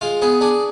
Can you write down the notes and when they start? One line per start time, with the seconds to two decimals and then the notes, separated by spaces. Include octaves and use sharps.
0.01 G#3 F4
0.22 B3 G#4
0.41 D4 G#4